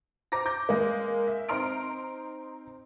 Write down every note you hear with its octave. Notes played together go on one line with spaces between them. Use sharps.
C5 A#5 D6 A#6
D6 G6 A#6
G#3 A#3
E5
C4 D#4 A#5 C6 F6 D7